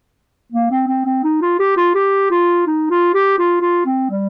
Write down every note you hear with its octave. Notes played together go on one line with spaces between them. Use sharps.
A#3
C4
C4
C4
D#4
F4
G4
F4
G4
F4
D#4
F4
G4
F4
F4
C4
G3